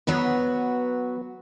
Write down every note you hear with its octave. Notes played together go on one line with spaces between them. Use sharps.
F#3 B3 F#4 B4